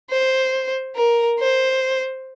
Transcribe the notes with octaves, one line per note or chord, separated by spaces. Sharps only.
C5
A#4
C5